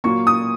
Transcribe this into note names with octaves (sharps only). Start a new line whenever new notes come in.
A#2 F#3 A#3 C#6
D#6